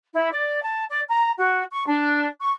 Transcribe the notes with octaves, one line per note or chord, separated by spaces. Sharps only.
E4
D5
A5
D5
A#5
F#4
C#6
D4
C#6